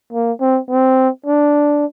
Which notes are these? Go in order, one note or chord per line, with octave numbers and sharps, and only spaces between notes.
A#3
C4
C4
D4